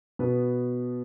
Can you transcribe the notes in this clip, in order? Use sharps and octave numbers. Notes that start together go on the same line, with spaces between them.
B2 B3 B4